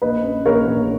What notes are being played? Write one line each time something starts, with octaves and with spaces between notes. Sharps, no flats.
A#1 B4 D#5
C#4
A#1 A#4 C#5
A#1